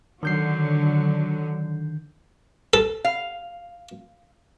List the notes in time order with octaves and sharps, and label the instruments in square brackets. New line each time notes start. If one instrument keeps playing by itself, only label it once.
[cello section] D3 F#3 [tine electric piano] D#3 G6 C7
[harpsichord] A4
[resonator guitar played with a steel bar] F5